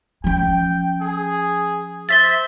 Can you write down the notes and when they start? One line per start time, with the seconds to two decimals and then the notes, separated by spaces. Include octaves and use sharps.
0.24 F3 C#4 G5
1.01 G#4
2.09 C5 E5 A6 B6 G7